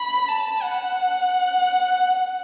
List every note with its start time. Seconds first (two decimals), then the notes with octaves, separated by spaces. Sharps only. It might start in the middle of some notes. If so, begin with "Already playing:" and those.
Already playing: B5
0.28 A5
0.62 F#5